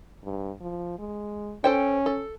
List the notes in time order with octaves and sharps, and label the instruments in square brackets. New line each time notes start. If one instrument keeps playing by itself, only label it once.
[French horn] G2
F3
G#3
[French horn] C#4 [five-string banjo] A4 C5 G5
[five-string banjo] A4